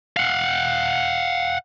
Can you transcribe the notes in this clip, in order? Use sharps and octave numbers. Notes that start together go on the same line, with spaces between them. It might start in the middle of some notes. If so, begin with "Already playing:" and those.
F5 F#5